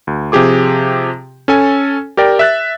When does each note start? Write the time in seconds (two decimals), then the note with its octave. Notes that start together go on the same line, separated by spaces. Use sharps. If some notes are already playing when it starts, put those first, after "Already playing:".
0.07 D2
0.32 C3 F3 G4 G#4 D6
1.48 C#4 A4 G#5
2.17 G4 A#4 D5 G5
2.39 E5 F#6 A6